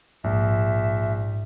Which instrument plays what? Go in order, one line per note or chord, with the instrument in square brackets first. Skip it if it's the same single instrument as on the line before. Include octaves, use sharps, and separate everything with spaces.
[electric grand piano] A#1 [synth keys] G#2 [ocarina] E5